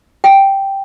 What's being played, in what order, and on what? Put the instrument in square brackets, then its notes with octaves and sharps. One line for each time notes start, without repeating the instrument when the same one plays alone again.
[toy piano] G5